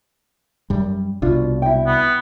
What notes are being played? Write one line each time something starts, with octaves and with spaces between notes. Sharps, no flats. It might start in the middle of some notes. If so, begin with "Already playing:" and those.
F#2 G3
C2 B2 D4 F4
E4 G5
B3